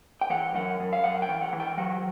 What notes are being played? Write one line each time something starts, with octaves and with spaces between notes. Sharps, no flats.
G5
E3 F#5
F#2 F#5
F#2
F5
F#2 F#5
G5
E3
F#5
E3
G5
F#3 F#5